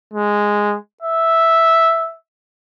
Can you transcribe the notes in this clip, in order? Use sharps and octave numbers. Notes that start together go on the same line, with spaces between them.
G#3
E5